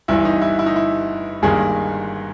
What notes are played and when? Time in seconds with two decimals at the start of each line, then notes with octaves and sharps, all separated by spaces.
0.08 G1 G2 E3 E4
0.25 D#4
0.41 E4
0.59 E4
0.66 D#4
0.76 E4
1.42 G1 G2 D#3 G#3 A#3 G#4